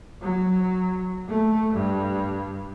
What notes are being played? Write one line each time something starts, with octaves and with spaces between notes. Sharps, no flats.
F#3
A3
G2